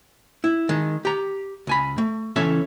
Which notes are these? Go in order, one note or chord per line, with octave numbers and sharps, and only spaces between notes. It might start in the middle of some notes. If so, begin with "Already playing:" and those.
E4
D#3 G#3
G4 A#5
C#2 G#5 B5
A3
C#2 E3 C#4 A4 C#5 E5